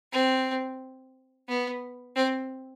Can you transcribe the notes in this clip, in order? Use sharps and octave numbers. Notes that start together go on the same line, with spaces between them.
C4
B3
C4